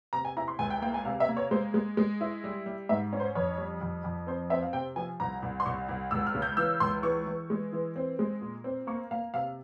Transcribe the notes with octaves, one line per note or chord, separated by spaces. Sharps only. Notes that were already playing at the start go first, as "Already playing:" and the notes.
C3 A#5
G#5
E4 A#5
C6
C#2 G#5
G5
A#3 G5
G#5
C3 F5
E5
A#3
C#5
G#3 C5
G#3
G#3
E4
G3
G3
G#2 E5
C#4
C5
F2 C#5
G3
F2
F2
C4 C5
C4 E5
F5
C3 G5
F3 G#5
C2 A#5
C2
C6
C2 C#6
C2
C#2 E6
F6
C#3
G6
E3 E6
C#2 C6
E3 C#6
E3
G#3
E3
C4
G#3
A#2
C4
A#3 C#6
A#3 F5
C3 F5